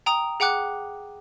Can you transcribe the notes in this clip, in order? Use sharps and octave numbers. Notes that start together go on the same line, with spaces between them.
G5 A#5 D#6 D7
G#4 F#5 G5 D6 F#6